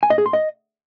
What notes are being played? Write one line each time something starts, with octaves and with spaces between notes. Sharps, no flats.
G#5
D#5
G#4
C6
D#5